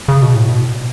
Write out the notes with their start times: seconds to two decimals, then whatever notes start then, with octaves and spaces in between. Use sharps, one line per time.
0.08 C#3
0.22 B2
0.36 A2
0.49 B2